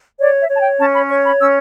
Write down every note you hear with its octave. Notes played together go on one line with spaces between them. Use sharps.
C#5 D5
E5
C#5 A5
G5
C#4 A5
B5
C#5 C#6
B5
C#4 E6